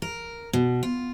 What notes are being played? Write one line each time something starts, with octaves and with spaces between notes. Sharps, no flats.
A#4
B2
F4